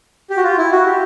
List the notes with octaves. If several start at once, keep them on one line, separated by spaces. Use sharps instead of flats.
G4
F#4
F4
E4
F#4
G4